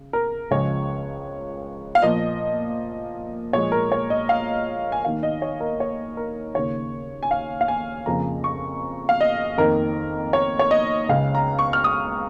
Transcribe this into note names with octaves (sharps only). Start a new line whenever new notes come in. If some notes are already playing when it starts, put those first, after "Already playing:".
Already playing: C#3
A#4
C#2 C#3 F3 G#3 C#5
F5
A#2 F3 A#3 D#5
A#2 F3 G#3 C#5
A#4
C#5
D#5
F5
G#5
D#2 D#3 A#3 F5
D#5
C#5
A#4
C#5
A#4
D#2 C#3 A#3 C#5
G#5
F5
F5
G#5
F2 C#3 F3 A#3 A#5
C#6
F5
D#5
F2 D#3 A#3 A#4
C#5
C#5
D#5
C#2 C#3 G#3 F5
A#5
C#6
F6
D#6